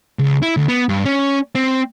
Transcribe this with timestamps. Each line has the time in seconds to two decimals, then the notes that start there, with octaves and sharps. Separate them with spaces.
0.19 C#2
0.42 E4
0.57 D2
0.68 B3
0.89 G2
1.05 C#4
1.55 C4